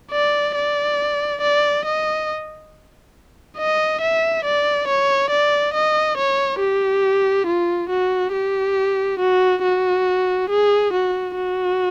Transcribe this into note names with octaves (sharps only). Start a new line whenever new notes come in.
D5
D5
D5
D#5
D#5
E5
D5
C#5
D5
D#5
C#5
G4
F4
F#4
G4
F#4
F#4
G#4
F#4
F#4